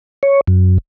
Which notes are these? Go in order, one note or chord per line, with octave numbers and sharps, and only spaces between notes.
C#5
F#2